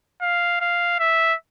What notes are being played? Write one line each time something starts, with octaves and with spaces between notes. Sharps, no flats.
F5
F5
E5